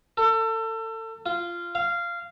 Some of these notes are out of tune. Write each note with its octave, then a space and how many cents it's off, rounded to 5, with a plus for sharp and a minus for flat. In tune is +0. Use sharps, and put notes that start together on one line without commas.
A4 +30
F4 -15
F5 -15